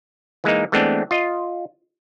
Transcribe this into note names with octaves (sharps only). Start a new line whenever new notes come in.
E3 G#3 A#3 D#4
E3 G#3 A3 B3 C4 D4
F4 D#5